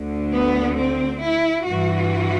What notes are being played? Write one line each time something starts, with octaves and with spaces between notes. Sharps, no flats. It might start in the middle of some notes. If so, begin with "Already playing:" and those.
Already playing: D2 D3
B3
C4
E4
G2 E3 F#4